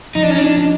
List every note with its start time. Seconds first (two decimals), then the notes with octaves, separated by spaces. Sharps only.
0.15 F3 D#4
0.23 D4
0.30 C#4
0.38 D4
0.57 D#4